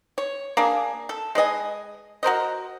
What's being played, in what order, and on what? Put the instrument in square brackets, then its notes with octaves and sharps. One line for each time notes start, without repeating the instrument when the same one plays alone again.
[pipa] C#5
A#3 D4 G#4
A4
G#3 B4 D#5 G#5
F#4 A#4 C5 D#5